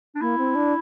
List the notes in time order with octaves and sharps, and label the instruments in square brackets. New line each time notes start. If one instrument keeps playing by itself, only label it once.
[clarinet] D4
[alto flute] A#3 [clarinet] E4
[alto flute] C4
D4